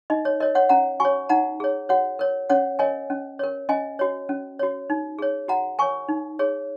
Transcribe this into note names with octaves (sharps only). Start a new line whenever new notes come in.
D#4 D#5
C#5
A#4 C#5 D#5
C#5 F#5
C#4 F#5 A#5
F#4 C#5 G#5 C#6
D#4 F#5 A#5
G#4 C#5
F#4 C#5 F#5
A#4 C#5
C#4 C#5 F#5
A#4 C#5 D#5 G#5
C#4
A#4 C#5
C#4 D#5 G#5
F#4 C#5
C#4
F#4 C#5
D#4
G#4 C#5
F#4 F#5 A#5
A#4 C#5 G#5 C#6
D#4
G#4 C#5